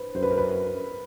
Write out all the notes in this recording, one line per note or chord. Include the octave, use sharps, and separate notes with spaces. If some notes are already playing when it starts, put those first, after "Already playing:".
Already playing: B4 C5
F#2 C5
B4
A#4
B4